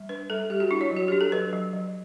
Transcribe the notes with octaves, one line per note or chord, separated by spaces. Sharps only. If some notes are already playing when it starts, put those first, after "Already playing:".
Already playing: G3
D4 B4
G3 A4
G3 G4
F#4
D4 E4
C#5
F#3
F#4
D4 G4
A4
F#3 B4
F#3
F#3